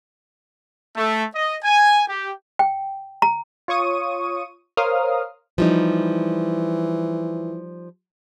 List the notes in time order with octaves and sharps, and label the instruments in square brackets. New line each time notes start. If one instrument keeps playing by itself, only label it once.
[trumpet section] A3
D#5
G#5
G4
[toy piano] G5
A#5
[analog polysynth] F4 C#5 C#6 D#6 D#7
A#4 C5 C#5 F5 D#6 F6
[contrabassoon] E3 [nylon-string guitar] F3 G3 D#4